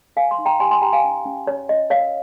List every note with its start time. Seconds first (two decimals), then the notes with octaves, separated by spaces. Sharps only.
0.16 A#4 F5 G#5
0.31 G#5 C6
0.39 D#4
0.46 G5 A#5
0.60 G4 G#5 C6
0.71 G#5 C6
0.82 G4 G5 A#5
0.93 F5 G#5
1.04 C#4
1.25 C#4
1.47 C#4 C#5
1.69 C#4 D#5
1.90 A#4 C#5 F5